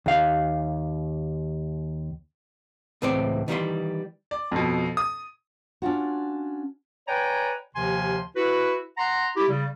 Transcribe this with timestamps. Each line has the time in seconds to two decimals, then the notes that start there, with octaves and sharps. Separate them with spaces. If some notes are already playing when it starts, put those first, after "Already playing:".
0.06 D#2 F5
3.02 C#2 A2 E3 C4 C5 D5
3.48 D#3 E3 G3 F#4 E5 C6
4.31 D5
4.52 F2 B2
4.97 D#6
5.82 C#4 D4 F4 F#4
7.08 B4 C#5 D5 G5 G#5 A#5
7.75 D#2 C3 D#3 F3 G#5 C6
8.36 E4 F#4 B4
8.98 F#5 A#5 C6
9.36 E4 G4
9.49 C#3 G3